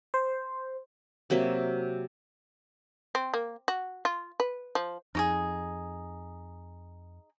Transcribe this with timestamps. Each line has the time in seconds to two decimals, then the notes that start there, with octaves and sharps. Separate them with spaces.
0.14 C5
1.30 C3 F#3 A#3 E5
3.15 C4
3.34 A#3
3.68 F#4
4.05 F4
4.40 B4
4.75 F3
5.15 F2 D#4 G4 G#4